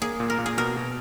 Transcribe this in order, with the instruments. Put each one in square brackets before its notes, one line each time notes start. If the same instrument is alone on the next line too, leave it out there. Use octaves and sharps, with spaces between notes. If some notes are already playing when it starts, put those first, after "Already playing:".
[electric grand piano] A#3 [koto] G#4
[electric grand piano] A#2
[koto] A#4
[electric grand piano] A#2
[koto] G#4
[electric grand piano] B2 [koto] A#4
[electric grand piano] B2